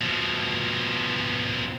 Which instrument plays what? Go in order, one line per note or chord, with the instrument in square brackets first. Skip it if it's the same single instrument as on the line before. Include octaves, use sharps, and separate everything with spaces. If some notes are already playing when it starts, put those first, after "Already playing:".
[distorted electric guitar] B2 F3